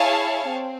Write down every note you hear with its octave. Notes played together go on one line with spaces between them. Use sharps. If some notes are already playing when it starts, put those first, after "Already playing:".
Already playing: E4 G#4 C#5 F5 A5
C4